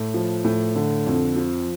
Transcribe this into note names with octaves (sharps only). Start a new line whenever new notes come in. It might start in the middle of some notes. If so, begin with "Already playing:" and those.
Already playing: A2
F3
A2
D3
F2
F3